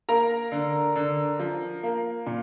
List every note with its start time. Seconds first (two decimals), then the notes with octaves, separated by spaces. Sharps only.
0.09 A#3 A#4 A#5
0.52 D3
0.96 D3
1.39 F3
1.83 A#3
2.26 A#2